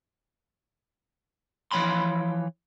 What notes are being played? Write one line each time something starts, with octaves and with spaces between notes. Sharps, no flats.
E3 F3 C#5 B5 C6